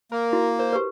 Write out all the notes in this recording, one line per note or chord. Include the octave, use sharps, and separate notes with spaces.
A#3 A#4
E4 F#4
A#4 C5
G4 B4